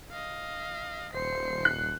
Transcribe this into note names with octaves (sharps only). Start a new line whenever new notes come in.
D#5 F5
D#1 C5 C7 C#7
F#6